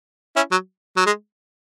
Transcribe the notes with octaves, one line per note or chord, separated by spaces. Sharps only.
C#4 E4
F#3
F#3
G#3